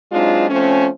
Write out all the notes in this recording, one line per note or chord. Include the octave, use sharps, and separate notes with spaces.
F#3 G#3 C4 D4 D#4 F4
F3 A3 C4 C#4